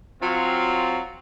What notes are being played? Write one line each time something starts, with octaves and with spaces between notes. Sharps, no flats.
F#3 C4 F4